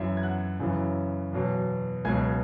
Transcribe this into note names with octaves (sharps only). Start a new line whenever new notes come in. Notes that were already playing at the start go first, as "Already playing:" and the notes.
Already playing: F#2 E3 E5
G#6
F#5 F#6
F#2 C#3 E3
E2 B2 F#3
C#2 B2 F#3 G#5 G#6